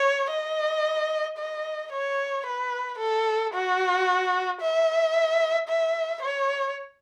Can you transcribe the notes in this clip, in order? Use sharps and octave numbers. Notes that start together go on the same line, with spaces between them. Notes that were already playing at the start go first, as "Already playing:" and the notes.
Already playing: C#5
D#5
D#5
C#5
B4
A4
F#4
E5
E5
C#5